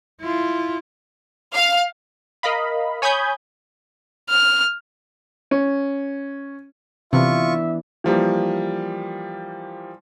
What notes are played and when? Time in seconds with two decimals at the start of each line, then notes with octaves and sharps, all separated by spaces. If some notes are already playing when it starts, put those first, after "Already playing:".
0.22 E4 F4
1.54 F5
2.43 A#4 D#5 F5 B5
3.02 C#5 G#5 B5 D#6 G6 G#6
4.30 F6
5.51 C#4
7.13 C3 E3 B3 D4 F4 E5 C#6
8.04 E3 F3 G3 A#3